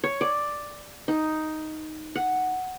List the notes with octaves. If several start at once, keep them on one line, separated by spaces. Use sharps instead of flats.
C#5
D5
D#4
F#5